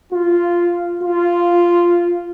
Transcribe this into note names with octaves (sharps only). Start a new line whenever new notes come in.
F4
F4